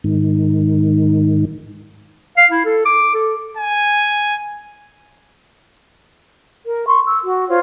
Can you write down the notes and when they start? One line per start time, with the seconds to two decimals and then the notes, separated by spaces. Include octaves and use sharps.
0.04 G#2 D#3
2.37 F5
2.51 E4
2.65 A4
2.86 D6
3.14 A4
3.57 G#5
6.65 A#4
6.88 C6 C#6
7.07 E6
7.24 F#4
7.49 F4 C5 C#5